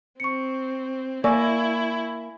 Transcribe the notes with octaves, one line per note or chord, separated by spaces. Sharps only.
C4 C#6 C#7
A#3 E4 D5 G#5 C#6 E6